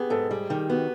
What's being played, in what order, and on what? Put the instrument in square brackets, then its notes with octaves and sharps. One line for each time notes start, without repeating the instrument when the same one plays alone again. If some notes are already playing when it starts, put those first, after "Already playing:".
Already playing: [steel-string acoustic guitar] B3 [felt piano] G4 G#4
[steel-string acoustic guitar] G#2 [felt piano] A4
[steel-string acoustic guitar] G3 [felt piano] G#4
[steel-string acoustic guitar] D#3 [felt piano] G4
[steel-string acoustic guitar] B3 [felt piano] F#4